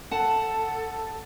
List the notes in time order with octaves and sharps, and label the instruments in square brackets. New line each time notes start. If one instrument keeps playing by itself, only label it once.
[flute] A4 [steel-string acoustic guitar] F#5 A5